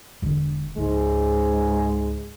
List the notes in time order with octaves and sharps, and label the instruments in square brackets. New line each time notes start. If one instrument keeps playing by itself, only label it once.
[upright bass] E1 D3
[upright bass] C#2 [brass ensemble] G#2 G#3